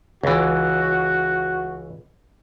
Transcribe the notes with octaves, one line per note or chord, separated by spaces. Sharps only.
C#2 E3 F#4